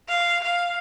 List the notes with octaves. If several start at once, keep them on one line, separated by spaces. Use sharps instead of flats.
F5
F5